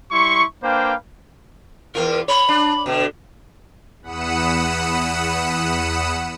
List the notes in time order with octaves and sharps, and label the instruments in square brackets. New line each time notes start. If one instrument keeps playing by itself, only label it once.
[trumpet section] G3 E4 C6 C#6
A#3 D4 B4 C5 F5 G5
[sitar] E2 F4 [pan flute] A#4
[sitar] C#5 [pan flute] B5
[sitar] D4
B2 D3
[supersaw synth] E2 F#5 B5 D#6 C#7 E7